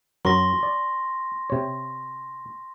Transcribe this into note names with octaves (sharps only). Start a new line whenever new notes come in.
F#2 F#3 A#4 C6 C#6 A#6
D5
C3 C#5